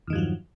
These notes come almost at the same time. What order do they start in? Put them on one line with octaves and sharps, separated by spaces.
E2 D#3 G2 F3 F#3